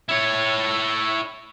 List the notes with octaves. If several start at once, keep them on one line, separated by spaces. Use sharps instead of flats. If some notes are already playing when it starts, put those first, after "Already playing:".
E4 C#5